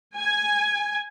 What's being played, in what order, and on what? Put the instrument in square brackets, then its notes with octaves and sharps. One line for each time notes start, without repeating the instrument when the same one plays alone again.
[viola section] G#5